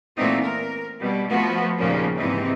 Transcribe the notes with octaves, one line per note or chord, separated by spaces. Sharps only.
A#2 E3 A3 B3 C4 D#4
A#4
B2 G3
F3 A3 B3 F#4
D#2 A#2 C#3 F3 A#3 C#4
G#2 C3 E3 C4 D#4